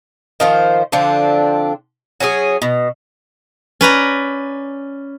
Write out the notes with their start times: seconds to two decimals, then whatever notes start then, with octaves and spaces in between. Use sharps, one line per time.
0.40 D#3 F3 C5
0.92 D3 F3 C4 D4
2.20 F#3 C#4 D4 G#4
2.62 B2
3.81 C#4 B4 D5 A#5